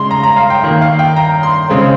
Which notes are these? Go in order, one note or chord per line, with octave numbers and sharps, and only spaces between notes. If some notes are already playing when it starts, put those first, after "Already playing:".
Already playing: C#3 G#3 C6
A#5
A#5
F5
G5
D#3 A#3
F5
G5
A#5
C6
C#3 G#3 C4